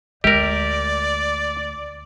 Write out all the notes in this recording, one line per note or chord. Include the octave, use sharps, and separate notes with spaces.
D2 G#3 G4 A#4 D5